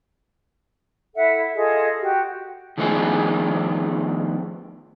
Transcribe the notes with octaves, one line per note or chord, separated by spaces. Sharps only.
E4 A4 E5 F#5
F4 G#4 A4 D#5
F#4 G4
D#3 F3 A3 B3 D4 G#4